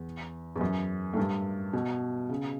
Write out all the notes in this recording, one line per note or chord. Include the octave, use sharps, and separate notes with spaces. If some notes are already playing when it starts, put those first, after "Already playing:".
Already playing: E2
E2
F#2
A2
G2
B2
C#3